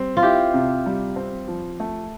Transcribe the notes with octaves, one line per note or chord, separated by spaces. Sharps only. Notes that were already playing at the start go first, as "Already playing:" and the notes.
Already playing: G3 C4
F4
E4 G4
C3
G3
C4
F3
A3